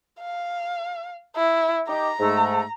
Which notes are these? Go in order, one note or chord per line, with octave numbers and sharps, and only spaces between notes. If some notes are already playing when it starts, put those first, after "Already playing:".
F5
E4
D#4 G4 A#5
G#2 A3